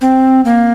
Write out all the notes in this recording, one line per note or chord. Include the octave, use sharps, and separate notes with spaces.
C4
A#3